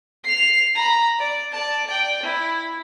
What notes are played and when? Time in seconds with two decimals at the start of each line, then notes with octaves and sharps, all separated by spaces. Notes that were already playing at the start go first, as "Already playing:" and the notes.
0.24 C7 F7
0.75 A#5 B5
1.19 D5
1.52 D5 A5
1.87 D5 G5
2.23 E4